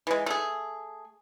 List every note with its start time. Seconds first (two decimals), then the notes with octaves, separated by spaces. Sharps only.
0.07 E3 G#3
0.26 A3 G#4